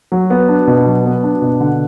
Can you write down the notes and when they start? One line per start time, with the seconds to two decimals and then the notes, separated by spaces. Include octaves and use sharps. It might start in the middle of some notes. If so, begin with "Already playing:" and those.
0.12 F#3
0.30 B3
0.49 D4
0.67 B2
0.86 F#3
1.05 B3
1.23 D4
1.42 B2
1.60 D3 F#5